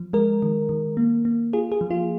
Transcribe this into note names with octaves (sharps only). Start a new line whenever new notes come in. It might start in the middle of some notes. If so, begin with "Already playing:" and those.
Already playing: F3
G#3 A#4
D#3
D#3
A#3
A#3
F4 G#4
G#4
F3
F4